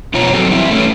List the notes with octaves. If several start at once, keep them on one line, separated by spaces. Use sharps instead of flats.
F2 B2 F4 C#5 A#5
F#3 C4 D#4 F#4 A4
E3 G3 C4 E4
A3 C4 C#4